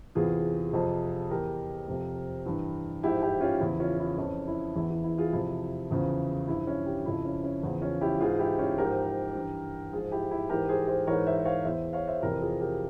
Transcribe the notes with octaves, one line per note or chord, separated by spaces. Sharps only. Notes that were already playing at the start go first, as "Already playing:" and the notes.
E2 C3 E3 F4 G#4
F2 C3 F3
E2 E3 G4 A#4
F2 C3 F3
G2 E3
G#2 F3 E4 G4
E4 G4
C#4 F4
E2 C#3 F3 E4
C#4 F4
E4
F2 E3 C#4
E4
E2 E3 E4
E4
E4
F4 G#4
F2 C3 F3 E4
E2 C#3 F3
G2 F3 E4
C#4
E4 G4
F2 C#3 F3 E4
C#4
C#4
E2 C#3 F3
C#4 F4
E4 G4
G#2 E3 F4 G#4
E4 G4
C#4 F4
G#2 F3 G4 A#4
G2 E3
G#2 F3 F4 G#4
E4 G4
E4
G#2 E3 G4 A#4
G#4 C5
G#4 C5
G#2 E3 A#4 C#5
C5 E5
C#5 F5
E2 E3 C5 E5
C#5 F5
C5 E5
F2 C3 E3 G4 A#4
F4 G#4
G4 A#4